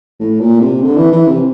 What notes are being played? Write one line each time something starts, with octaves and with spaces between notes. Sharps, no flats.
A2
A#2
C3
D3
E3
E3
C3